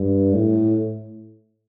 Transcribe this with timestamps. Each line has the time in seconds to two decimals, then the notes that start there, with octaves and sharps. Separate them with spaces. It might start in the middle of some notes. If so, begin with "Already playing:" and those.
Already playing: G2
0.34 A2